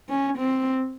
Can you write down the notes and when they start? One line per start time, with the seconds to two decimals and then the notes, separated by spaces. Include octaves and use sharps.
0.09 C#4
0.38 C4